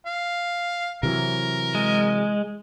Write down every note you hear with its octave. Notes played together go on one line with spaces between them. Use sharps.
F5
C3 E3 F#3 A#4
G#3